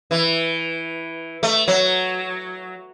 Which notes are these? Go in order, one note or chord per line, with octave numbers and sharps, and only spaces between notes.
E3
A3
F#3